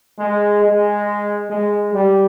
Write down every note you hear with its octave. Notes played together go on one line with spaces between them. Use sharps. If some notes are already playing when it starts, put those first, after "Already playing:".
G#3
G#3
G#3
G3